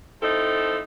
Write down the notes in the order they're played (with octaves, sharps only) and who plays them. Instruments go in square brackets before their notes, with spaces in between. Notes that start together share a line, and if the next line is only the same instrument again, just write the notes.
[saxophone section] F3 C4 D#4 E4 A4